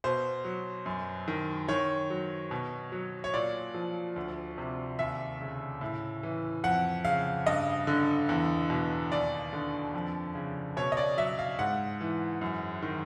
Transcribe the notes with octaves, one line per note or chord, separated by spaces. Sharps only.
B2 C5
F#3
F#2
D#3
D#3 C#5
F#3
B2
F#3
C#5
A#2 D5
F3
D2
C3
D#2 E5
C#3
A2
E3
F2 F#5
C#3 F5
G2 D#5
D3
E2
B2
D#2 D5
D3
F2
C#3
B2 C#5
D#5
D5
F#3 E5
F5
G#2 F#5
E3
F#2
D#3